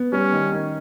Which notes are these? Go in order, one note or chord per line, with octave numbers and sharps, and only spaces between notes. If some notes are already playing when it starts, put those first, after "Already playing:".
Already playing: B3
G3 C#4
D#3
D#3